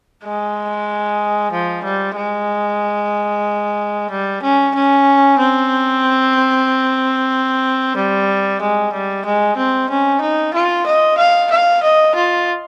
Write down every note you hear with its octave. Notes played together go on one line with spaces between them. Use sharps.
G#3
F3
G3
G#3
G3
C#4
C#4
C4
G3
G#3
G3
G#3
C4
C#4
D#4
F4
D#5
F5
F5
D#5
F4